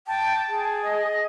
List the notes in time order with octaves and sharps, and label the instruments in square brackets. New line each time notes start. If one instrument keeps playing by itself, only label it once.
[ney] G5 [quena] A5
[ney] G#4
[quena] D#5